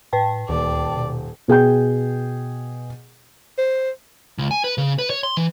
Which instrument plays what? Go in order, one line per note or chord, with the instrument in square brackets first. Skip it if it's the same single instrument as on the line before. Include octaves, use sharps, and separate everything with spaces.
[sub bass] A2 [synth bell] B4 G5 A5
[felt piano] D#1 [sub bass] D2 [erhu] D5
[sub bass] B2
[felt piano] B2 G#4 G5 G6
[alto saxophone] C5
[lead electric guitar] C#2
G#5
B4
C#3
B4
C#5
C6
E3